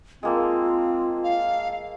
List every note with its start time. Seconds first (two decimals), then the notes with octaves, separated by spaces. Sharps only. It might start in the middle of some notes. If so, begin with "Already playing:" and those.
0.23 G#3 A#3 C4 F4 A4
1.24 F5